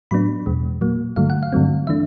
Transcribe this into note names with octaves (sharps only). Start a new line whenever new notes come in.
A2 F#3 B3 D4 B5
E2 B2 G#3
A#2 F#3 A#3
G2 D3 F#3 A3 F5
F#5
F5
G2 D3 F#3 A3 C4
E3 A3 D4 E5